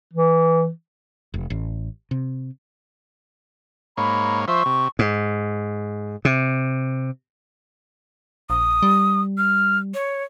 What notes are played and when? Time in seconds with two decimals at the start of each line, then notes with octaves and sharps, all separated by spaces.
0.13 E3
1.34 F1
1.50 A1
2.11 C3
3.97 G#2 A#3 C#5 B5
4.48 F3 C5 E5 C#6
4.66 C3
4.99 G#2
6.25 C3
8.50 A#1 D#6
8.83 G3
9.38 F6
9.94 C#5